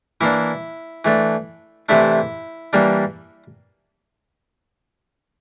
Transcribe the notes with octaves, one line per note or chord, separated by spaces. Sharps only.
E3 A#3 D4 E4
E3 A3 D4
C3 E3 A3 D4 E4
E3 G3 A#3 D4